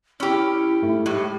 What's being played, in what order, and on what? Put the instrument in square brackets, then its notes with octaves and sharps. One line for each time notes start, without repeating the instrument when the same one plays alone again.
[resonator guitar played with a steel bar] C#4 G4 [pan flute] E4 [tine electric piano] B5 E6 F6
[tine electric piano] G#2 A3
[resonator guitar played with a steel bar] A2 [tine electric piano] G#3 [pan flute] G4